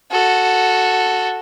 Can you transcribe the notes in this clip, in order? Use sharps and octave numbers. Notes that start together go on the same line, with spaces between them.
F#4 A4